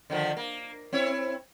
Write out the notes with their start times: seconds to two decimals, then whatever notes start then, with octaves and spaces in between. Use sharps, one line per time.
0.10 D3 D#3 F3
0.37 A#3
0.93 C4 E4 C#5